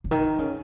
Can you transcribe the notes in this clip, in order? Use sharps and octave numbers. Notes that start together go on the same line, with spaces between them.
C#3
D#3
C#3